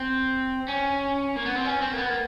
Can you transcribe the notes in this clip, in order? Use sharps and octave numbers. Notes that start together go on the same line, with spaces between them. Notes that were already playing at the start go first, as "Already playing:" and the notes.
Already playing: C4
C#4
A#3
B3
C4
C#4
C4
A#3
B3
A#3